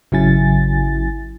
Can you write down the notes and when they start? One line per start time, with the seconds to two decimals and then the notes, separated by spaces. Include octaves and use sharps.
0.12 G#1 C#3 F#3 E4 G#5 A6